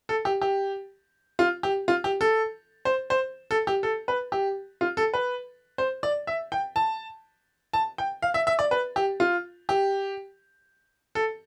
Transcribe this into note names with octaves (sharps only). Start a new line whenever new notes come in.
A4
G4
G4
F4
G4
F4
G4
A4
C5
C5
A4
G4
A4
B4
G4
F4
A4
B4
C5
D5
E5
G5
A5
A5
G5
F5
E5
E5
D5
B4
G4
F4
G4
A4